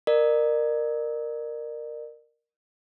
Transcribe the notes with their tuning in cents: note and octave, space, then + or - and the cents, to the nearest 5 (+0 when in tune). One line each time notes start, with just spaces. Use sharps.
A#4 +0 D5 +40